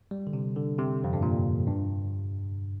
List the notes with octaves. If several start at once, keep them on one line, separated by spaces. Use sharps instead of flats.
G3
D3
C3
D3
C3
F2
G2
A#2
G2